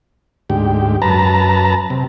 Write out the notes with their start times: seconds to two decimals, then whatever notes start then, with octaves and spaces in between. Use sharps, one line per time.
0.50 D2 G#2 G4
1.02 F#2 B4 A5 A#5
1.90 C3